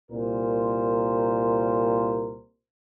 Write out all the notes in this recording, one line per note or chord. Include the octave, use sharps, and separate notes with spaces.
C2 A#2 A#4 C5